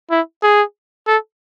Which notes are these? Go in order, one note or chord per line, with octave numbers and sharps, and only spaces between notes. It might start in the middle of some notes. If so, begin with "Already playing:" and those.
E4
G#4
A4